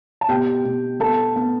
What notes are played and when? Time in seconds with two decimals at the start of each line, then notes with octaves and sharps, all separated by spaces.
0.21 A5
0.29 B2 G4 G5
0.65 B2
1.00 B3 A4 A5
1.36 B3